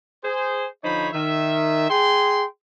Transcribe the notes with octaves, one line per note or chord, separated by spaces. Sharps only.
G#4 C5
D3 F3 D#4 C5 C#5 B5
D#3 E5
G#4 G5 C6